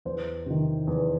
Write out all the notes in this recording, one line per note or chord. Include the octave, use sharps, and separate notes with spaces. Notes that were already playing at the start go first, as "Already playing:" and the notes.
E2 C5
C3 D#3
E2